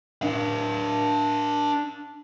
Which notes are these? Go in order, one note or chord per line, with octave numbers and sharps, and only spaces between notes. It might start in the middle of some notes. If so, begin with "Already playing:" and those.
D4 F5